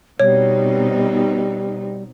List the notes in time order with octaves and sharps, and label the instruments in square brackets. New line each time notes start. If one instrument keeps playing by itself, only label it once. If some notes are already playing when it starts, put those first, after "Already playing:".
[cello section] B2 C4 D#4 [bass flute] G3 [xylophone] C#5